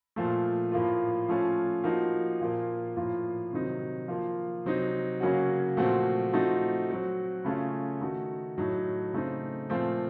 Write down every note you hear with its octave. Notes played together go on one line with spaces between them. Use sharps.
A#2 F3 A3
A2 F3 A#3 F4
F3 A3 C#4 F4
F3 A#3 D#4 F#4
A#2 F3 A#3 F4
A2 F3 A#3 F4
C3 D#3 F#3 C4 D#4
F3 A#3 F4
C3 F#3 C4 D#4
C#3 F#3 A#3 C#4 F#4
A#2 F3 A3 C4 F#4
F3 A3 C4 D#4 F#4
F#3 C4 F#4
C#3 A3 C#4 F4
D#3 A3 D#4 F#4
A2 F#3 A3 D#4
C#3 A3 C4 D#4
A#2 F3 A3 C4